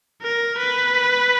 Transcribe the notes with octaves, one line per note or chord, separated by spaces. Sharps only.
A#4
B4